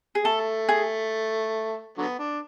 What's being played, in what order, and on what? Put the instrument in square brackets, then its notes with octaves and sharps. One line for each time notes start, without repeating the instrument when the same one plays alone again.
[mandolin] G#4
[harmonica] A3 [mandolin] A4
[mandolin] G#4
[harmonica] D3 F#3 B3
D4